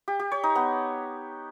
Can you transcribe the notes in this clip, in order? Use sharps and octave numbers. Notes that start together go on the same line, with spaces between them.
G4
G4
C#5
D#4
B3